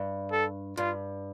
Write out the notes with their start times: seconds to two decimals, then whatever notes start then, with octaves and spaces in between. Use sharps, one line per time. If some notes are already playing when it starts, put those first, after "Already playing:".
Already playing: G2
0.32 A4
0.77 G2 F4